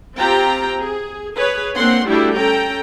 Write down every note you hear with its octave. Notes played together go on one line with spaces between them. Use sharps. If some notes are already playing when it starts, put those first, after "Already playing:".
C4 F4 G4 G5 A#5
G#4
G#4 B4 C#5
A#3 C4 D4 F#5 C6
G3 A3 D4 E4 F#4 G4
C#4 A4 G5 A#5